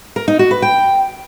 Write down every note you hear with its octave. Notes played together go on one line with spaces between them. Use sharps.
A#4
D#4
F#4
B4
G5